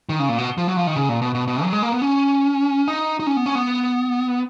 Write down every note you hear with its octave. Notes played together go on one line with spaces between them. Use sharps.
D#3
C#3
A#2
B2
F3
F#3
F3
D#3
C#3
A#2
B2
B2
B2
F#3
G#3
A#3
B3
C#4
D#4
D#4
C#4
B3
C#4
B3